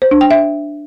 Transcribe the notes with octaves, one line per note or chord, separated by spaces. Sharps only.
C5
D4
G5
E5